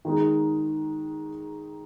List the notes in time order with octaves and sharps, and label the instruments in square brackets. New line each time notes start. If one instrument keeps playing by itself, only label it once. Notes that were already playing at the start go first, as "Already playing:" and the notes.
[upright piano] D#3 G#3 D#4